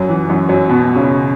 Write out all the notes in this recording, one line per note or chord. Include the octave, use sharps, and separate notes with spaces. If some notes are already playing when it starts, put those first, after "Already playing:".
Already playing: F#2 F#3
E3
F#2 F#3
F#2 F#3
B2 B3
C#3 C#4